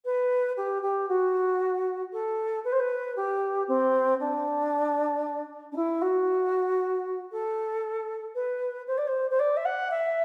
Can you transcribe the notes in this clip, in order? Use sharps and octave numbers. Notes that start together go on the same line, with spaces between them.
B4
G4
G4
F#4
A4
B4
C5
B4
G4
C4
D4
D4
E4
F#4
A4
B4
C5
D5
C5
C5
D5
E5
F#5
E5